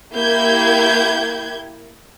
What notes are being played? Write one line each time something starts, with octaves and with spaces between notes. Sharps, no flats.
A#3 E4 G4 G6 G#6